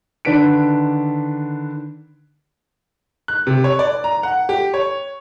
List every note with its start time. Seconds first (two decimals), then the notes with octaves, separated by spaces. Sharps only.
0.25 D3 D#3 D4 B4 B6 D7
3.28 F#6
3.47 C3
3.64 C#5
3.79 D5
4.04 A#5
4.23 F#5
4.49 G4
4.74 C#5